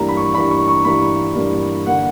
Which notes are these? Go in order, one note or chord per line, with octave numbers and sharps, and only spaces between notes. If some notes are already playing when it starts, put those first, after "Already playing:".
Already playing: G2 E3 G3 A#3 A#5
B5
C#6
G2 E3 G3 A#3 B5
C#6
C#6
G2 E3 G3 A#3 B5
G2 E3 G3 A#3
D3 A#3 F#5